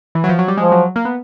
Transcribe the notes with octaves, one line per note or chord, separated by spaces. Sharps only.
E3
F#3
F3
F#3
G3
F3 G#3
F#3
A#3
B3